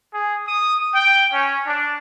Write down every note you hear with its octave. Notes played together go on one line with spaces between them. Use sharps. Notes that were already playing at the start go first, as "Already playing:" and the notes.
G#4
D#6
G5
C#4
D4